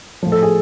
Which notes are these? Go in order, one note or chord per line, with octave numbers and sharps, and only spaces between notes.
A2 F3
A4
G#4